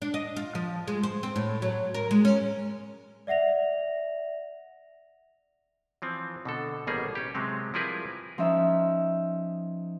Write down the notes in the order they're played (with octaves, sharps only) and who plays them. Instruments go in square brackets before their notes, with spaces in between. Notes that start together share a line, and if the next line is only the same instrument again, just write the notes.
[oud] D4
D#5
F4
F3
G#3
C5
C4
A2
F#3
A#4
G#3
C#4
[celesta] D5 E5 F#5 A#6 F7
[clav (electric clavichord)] E3 F3 C4
B2 D3 A4
A1 B2 G3 A#3 G#4
C#4 G4
C3 F#3 G#3 C4
F3 G3 E4 G#4 A#4 B4
[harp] F3 C#4 D#4 E5